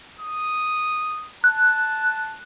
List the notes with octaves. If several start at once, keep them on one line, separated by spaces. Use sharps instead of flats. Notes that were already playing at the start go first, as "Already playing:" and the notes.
D#6
A5 F#6